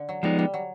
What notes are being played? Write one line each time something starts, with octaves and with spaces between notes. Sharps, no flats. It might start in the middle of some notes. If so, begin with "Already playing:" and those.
Already playing: D3
F#3
F3 G3 G#3 B3 D#4
G3
F#3